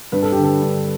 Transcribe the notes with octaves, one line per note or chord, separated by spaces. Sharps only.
G2 B4
A4
D3 G4
A4
G2